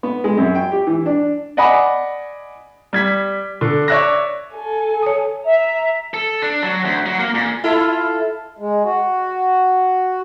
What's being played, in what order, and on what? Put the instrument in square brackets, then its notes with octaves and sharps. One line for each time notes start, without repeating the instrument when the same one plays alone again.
[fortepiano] B3
G#3
F#2
G5
G4
E3
D4
[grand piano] D5 D#5 F#5 G#5 B5 D#6
G3 G#6 B6
D3
C#5 D5 E5 F#6 A#6
[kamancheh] A4 G#5
[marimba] C#5 D#6
[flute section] E5 [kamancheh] A#5
[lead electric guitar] A4
D4
F#3
D2
F#3
A#3
A#2
[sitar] E4 F4 A4
[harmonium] G#3
F#4